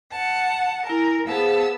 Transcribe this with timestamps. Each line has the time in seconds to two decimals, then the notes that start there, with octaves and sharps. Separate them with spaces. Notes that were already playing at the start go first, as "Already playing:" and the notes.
0.11 F#5 A5
0.87 E4 A#4 G#5
1.27 B3 G#4 C5 F5 A5 E6